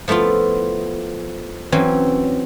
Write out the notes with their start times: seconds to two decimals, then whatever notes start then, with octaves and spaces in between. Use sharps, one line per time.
0.08 F3 A3 B3 E4 F4
1.72 E3 F#3 C4 C#4